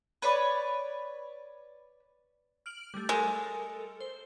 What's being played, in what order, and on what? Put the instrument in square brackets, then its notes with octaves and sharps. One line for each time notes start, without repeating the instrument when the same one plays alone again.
[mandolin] B4 C#5 D5
[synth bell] F6 D7 F#7
G3 A3
[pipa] G#3 [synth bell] A4 A#4
[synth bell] C5